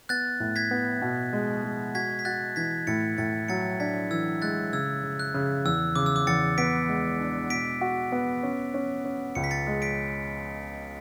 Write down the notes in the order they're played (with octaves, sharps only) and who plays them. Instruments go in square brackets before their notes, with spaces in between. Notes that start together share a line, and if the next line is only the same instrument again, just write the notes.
[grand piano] B3 [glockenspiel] F#6 A6
[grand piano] A2
[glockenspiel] G#6 B6
[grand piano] B3
B2
G#3
G#3
[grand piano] F#4 [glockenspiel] G#6 B6
[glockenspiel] B6
[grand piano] F#4 [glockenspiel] F#6 A6
[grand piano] E3 [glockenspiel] G#6 B6
[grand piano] A2 [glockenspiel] A6 C#7
[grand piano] A2 [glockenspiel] A6 C#7
[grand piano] F#3 [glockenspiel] A6 C#7
[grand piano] D4 [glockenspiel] G#6 B6
[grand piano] E3 [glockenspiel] E6 G#6
[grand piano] G#3 [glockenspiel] F#6 A6
[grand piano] C#3 [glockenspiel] E6 G#6
[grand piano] C#3
[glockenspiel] F#6
[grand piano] C#3
[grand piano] E2 [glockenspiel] E6
[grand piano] C#3 [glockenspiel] D6
[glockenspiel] E6
D6
[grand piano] E2 [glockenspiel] A6 C#7
[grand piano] B3 [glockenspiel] B6 D7
[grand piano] G#3
D4
[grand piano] B2 [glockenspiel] B6 D7
[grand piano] F#4
B3
C#4
C#4
C#4
[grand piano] C#2 [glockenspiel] C#7
[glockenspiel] B6
A6 C#7
[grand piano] G#3
[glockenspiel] B6 D7